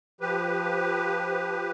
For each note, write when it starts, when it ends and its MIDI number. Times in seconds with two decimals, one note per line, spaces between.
0.21 1.71 53
0.21 1.71 67
0.21 1.71 71